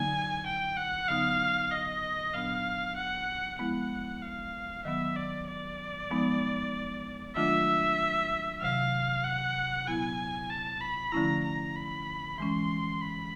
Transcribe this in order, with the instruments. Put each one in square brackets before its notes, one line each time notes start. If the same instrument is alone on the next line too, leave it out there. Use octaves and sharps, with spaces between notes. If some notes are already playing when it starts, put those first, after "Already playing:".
Already playing: [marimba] D3 F#3 A#3 D#4 [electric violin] G#5
[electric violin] G5
F#5
[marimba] D3 F#3 B3 D#4 [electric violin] F5
[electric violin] D#5
[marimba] A#2 F#3 B3 D4 [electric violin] F5
[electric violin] F#5
[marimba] F3 G#3 B3 E4 [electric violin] F#5
[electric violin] F5
[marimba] D#3 F#3 B3 [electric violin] E5
[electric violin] D5
D5
[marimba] F3 G#3 B3 D#4
[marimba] D#3 F#3 A3 D4 F4 [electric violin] E5
[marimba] C3 D#3 F#3 [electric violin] F5
[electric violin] F#5
[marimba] A#2 F#3 B3 E4 [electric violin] G#5
[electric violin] A5
B5
[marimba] D3 F3 A3 C#4 E4 [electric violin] A#5
[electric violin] A#5
B5
[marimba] E3 G#3 C#4 [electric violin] C6
[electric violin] B5